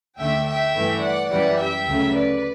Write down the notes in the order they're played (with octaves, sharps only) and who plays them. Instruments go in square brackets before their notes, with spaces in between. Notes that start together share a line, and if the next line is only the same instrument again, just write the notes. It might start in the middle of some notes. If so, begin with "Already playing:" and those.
[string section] D2 D3 A3 E5 G5
E5 G5
G2 E3 A3
D5 F#5
F#2 E3 G3 D5 F#5
E5 G5
D2 C#3 F#3 A3
B4 D5